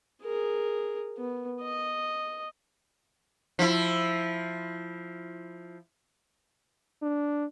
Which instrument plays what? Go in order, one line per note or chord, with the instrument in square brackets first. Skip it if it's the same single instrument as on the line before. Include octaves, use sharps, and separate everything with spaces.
[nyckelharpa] G#4 A#4
B3
D#5
[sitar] F3 E4
[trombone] D4